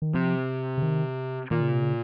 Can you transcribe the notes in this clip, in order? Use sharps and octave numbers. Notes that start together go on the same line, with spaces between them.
D#3
C3 F3
C#3
D#3
A#2 D#3
C#3
C3
C#3